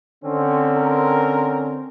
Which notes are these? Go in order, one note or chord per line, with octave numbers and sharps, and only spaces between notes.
D3 C4 C#4
A#4